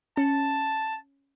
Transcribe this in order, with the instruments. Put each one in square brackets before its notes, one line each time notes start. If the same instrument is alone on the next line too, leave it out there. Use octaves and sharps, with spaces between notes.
[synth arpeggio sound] C#4 [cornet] A5